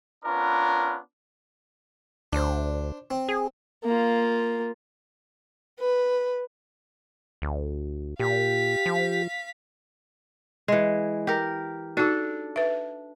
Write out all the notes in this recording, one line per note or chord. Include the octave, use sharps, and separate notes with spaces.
B3 C#4 D4 F4 A#4 B4
D2 D4 C5
C4
G#4
A#3 F4
B4
D2
A#2 G4 F5 B6
F3
E3 G#3
G4 A#4
D4 D#4 F#4 A4
B4 E5